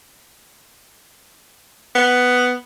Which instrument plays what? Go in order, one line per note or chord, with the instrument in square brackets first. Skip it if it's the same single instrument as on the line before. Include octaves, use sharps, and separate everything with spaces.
[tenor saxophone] B3